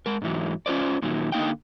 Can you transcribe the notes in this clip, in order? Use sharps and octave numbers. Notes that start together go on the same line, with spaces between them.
G#3 A#4
G#2 E3 F#3
C#4 F4 A#4 C5 D5
A#2 D#3 F#3
D3 A#3 D#4 F5 G5